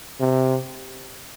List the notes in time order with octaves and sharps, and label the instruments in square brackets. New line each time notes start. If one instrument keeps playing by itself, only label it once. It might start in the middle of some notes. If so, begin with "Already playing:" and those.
[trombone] C3